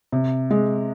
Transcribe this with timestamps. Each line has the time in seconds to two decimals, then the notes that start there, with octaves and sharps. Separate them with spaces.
0.12 C3
0.51 G#3